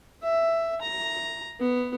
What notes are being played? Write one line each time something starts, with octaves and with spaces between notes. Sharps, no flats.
E5
A#5
B3